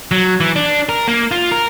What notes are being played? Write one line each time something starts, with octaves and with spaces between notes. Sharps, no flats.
F#3
E3
D4
A#4
A#3
F4
A#4